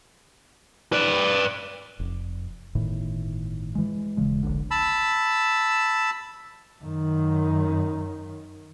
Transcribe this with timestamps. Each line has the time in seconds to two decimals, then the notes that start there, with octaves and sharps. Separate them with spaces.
0.93 B4 D5
1.99 F1
2.75 G1 A2 D#3
3.75 E3 G#3
4.17 D#1 C#3 G#3
4.43 D1 A#1 D3
4.71 A5 B5 E6
6.83 F#2 D#3